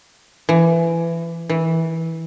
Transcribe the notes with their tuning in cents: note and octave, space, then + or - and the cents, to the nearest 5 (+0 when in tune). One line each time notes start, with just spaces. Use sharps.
E3 +20
E3 -15